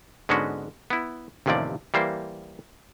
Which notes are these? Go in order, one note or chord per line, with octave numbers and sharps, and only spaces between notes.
G#2 D3 G#3 B3 C#4 F#4
B3 E4
A1 D#2 C3 E3 F3 D5
E3 G3 A#3 C5